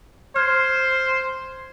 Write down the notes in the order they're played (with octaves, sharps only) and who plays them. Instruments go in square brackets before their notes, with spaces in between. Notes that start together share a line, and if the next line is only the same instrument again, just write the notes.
[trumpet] C5 [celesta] F6 G#6